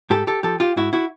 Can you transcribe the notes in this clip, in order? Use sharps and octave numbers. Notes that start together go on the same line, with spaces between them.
G#2 G4 A4
G4 A4
F3 G4 A4
F4 G4
G#2 E4 F#4
E4 F#4